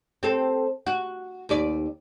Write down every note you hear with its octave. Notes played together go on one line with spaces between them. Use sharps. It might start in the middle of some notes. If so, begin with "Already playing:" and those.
C4 A4
F#4
D#2 B4 D5